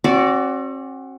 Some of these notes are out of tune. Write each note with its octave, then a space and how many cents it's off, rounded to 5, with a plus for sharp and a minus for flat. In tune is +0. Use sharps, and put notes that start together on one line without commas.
C4 +45 F#4 +10 D5 -10